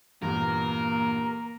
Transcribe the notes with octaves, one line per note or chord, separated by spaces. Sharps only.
E2 G2 A#2 A#3 A#4 A#5